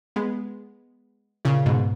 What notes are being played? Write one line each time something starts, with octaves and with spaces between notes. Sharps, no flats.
G#3 B3
A#2 C#3
G#2 B2